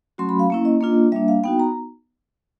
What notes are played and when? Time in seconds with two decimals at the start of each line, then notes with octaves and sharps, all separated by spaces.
0.18 F#3 A3 C#4 F#4 C6
0.29 B5
0.39 F5
0.50 A#3 C#4 E4
0.65 D#5
0.81 A#3 D4 F4
1.12 G3 A#3 D4 E5
1.28 F5
1.44 B3 D#4 F#4 G5
1.60 A#5